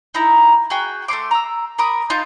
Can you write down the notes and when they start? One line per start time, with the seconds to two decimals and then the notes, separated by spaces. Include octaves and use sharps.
0.14 D#4 E4 A#5
0.70 F#4 G#4 G5
1.08 A3 C4 C6 D6
1.31 A#5 E6
1.79 A#4 B5 D6 D#6
2.10 D#4 F4 A5 G6